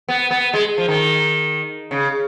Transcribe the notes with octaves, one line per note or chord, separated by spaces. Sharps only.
B3
B3
G#3
F3
D#3
C#3